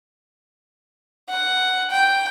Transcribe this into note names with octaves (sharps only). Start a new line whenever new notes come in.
F#5
G5